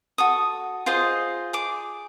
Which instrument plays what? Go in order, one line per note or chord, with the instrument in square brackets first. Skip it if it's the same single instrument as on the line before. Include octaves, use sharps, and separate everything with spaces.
[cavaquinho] F#4 A4 D#6
F4 G#4 C5 D#5
G#4 D6